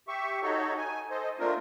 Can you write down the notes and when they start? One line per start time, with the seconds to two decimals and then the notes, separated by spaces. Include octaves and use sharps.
0.08 G4 E5 C#6
0.43 D#4 F#4 A4 C#5
0.78 G#5
1.11 A4 C5 D#5
1.39 A3 A#3 C4 D4 F4 A#4